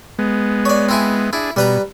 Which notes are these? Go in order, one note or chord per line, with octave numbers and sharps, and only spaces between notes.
G#3 B3
C#5 D5
C4 E4 G#5
D4 E4 G#4
B2 G3 B4 A#5